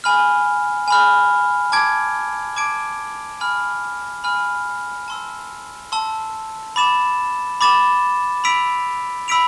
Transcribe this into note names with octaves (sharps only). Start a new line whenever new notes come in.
G#5 B5 F6
G#5 B5 F6
A5 D6 G#6 D7
A5 D6 G#6 D7
G#5 B5 F6
G#5 B5 F6
A5 C6 E6
A5 C6 E6
B5 D6 A6 E7
B5 D6 A6 E7
B5 E6 B6 D7 F7
B5 E6 B6 D7 F7